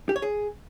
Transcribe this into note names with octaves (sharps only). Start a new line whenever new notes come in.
G4
C#5
G#4